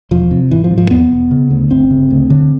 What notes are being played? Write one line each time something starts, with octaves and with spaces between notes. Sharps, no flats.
E1 F3
C3
G#1 E3
F3
G#2
F3
E2 B3
E1
C#3
D2
G1 C4
C#3
D2
D3